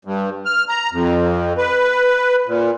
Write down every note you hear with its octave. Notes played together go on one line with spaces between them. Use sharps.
G2
F6
A#5
F2
B4
A#2